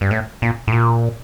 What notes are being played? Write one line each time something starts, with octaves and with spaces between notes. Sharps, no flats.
G2
A2
A#2
A2
A#2